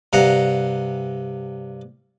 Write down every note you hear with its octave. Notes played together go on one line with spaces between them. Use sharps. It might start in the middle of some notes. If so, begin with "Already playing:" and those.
G2 C3 F5 F#5 A#5